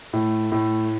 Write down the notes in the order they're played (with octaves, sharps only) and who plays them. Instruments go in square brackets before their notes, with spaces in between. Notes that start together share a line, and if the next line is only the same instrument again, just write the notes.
[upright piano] A2 [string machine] A3
[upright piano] A2